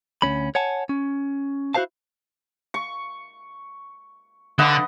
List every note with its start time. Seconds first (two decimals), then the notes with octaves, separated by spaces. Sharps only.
0.22 D2 G#2 C#4 B5
0.55 C#5 F#5 G#5 A5
0.89 C#4
1.74 E4 F#4 A4 C5 F5 A5
2.74 C#6
4.59 D3 B4 D#5 F#5